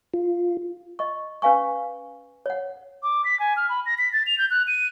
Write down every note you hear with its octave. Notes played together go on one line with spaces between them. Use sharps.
F4
D#5 C#6
C#4 B4 F5 G#5 C#6
C#5 F#5
D6
B6
G#5
F6
B5
A#6
B6
A6
F7
G6
F#6
D#7